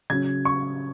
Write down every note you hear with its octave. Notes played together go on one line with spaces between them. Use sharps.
C#3 F#3 C#4 G#6
C#6